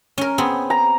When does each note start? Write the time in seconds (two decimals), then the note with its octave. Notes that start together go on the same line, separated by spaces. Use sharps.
0.18 C#4 A#4
0.38 B3 C4 G#4
0.70 A#5